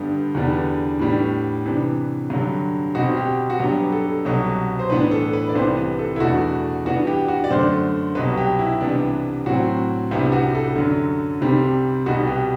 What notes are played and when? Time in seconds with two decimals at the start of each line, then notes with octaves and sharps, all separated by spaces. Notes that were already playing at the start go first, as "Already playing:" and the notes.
Already playing: G2 D3 G3 B3
0.34 E2 D3 G3 B3 D4
0.99 A2 G3 B3 D4
1.65 C3 E3 B3 D4
2.30 G2 D3 F#3
2.95 B2 G3 C4 F#4
3.17 G4
3.50 F#4
3.60 G2 F#3 B3 D4 G4
3.92 A4
4.25 C2 B2 F#3
4.79 C5
4.90 A2 E3 B3 D4 B4
5.11 A4
5.33 B4
5.49 D5
5.55 C2 C3 E3 B3 C5
5.76 B4
5.99 A4
6.16 E4
6.20 E2 B2 A3 D4 F#4
6.85 G2 E3 B3 D4 F#4
7.07 G4
7.28 F#4
7.44 D5
7.51 F#2 D3 A3 C5
8.15 C2 B2 F#3 B4
8.37 G4
8.59 E4
8.81 C2 C3 E3 B3 D4
9.46 A2 F#3 C4 F#4
10.11 C2 C3 G3 B3 D4 E4
10.32 F#4
10.55 A4
10.76 F#2 D3 F#3
11.41 C2 C3 G3 C4
12.06 C2 B2 G3 B3 F#4
12.27 G4